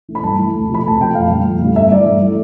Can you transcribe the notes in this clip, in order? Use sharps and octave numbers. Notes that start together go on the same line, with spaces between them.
E3 A3
B5
G2 A5
E3 A3
D2
C3 F3 A3 B5
D2 A5
C3 F3 A3 G5
F2 F5
D3 G3
F2
D3 G3
G2 E5
E3 A3 D5
G2
E3 A3